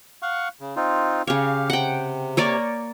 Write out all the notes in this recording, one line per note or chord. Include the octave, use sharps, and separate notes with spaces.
F5 F#5 C#6
C#3
C4 D#4 F4
C#3 G4 C#5 F5
C3 F#5 G5
A#3 C#5 D5